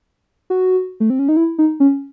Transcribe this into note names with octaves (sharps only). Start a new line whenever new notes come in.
F#4
A3
C4
C#4
D#4
E4
D#4
C#4